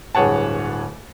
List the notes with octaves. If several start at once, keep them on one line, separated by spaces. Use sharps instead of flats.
D1 G2 G#4 C#5 F#5 A5